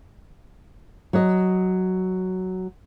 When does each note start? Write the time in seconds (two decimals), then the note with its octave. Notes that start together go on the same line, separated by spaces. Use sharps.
1.13 F#3 D#5